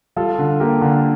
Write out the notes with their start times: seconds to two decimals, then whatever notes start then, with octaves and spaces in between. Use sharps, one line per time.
0.16 G3 F4 A4
0.39 D3
0.60 A#3 G4 A#4
0.82 D3